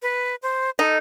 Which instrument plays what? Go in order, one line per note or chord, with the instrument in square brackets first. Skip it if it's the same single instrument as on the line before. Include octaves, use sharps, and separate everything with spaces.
[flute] B4
C5
[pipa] D#4 [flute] A4